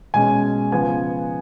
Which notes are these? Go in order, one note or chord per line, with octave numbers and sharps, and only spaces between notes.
B2 G#3 C#4 G#5
C#3 F3 B3 G#5